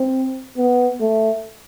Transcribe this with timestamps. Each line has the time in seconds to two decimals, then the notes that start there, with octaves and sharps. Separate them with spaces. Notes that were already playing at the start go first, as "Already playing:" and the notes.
Already playing: C4
0.58 B3
1.01 A3